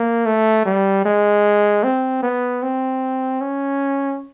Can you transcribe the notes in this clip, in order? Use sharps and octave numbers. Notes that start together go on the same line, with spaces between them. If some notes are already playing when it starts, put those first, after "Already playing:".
Already playing: A#3
A3
G3
G#3
C4
B3
C4
C#4